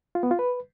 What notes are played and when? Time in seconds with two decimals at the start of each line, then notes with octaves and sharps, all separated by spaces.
0.15 F4
0.23 B3
0.31 F4
0.39 B4